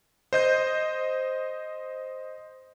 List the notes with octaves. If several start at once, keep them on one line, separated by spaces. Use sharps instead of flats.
C5 D#5 G6